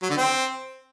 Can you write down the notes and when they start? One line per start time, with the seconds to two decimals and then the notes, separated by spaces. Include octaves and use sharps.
0.02 F#3
0.09 D3
0.17 C4